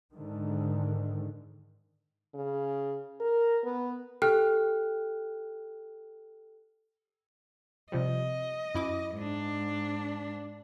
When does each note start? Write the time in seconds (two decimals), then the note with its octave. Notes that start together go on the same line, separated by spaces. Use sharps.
0.13 G#2 D3 D#3
2.34 C#3
3.20 A#4
3.65 B3
4.22 G4 A4 G5 F6 F#6
7.92 C3 F3 G3 D#5
8.75 F#2 E4 D6
9.17 G#2 D4